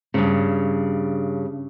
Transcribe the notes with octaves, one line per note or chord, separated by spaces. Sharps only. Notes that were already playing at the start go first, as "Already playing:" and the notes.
G2 A#2 C#3